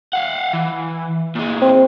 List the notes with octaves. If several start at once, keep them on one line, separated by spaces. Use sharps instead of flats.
F5 F#5
E3
A#2 G#3
C4